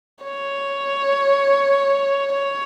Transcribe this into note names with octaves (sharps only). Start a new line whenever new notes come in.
C#5
C#5